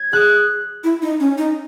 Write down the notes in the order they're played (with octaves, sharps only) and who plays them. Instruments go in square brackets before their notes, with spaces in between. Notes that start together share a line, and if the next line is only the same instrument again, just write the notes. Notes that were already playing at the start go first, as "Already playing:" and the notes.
Already playing: [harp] G#6
[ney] G#4 [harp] F#6
[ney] E4
D#4
C#4
D#4